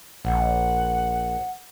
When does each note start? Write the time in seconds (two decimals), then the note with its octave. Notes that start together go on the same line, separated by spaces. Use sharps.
0.25 A#1 F#5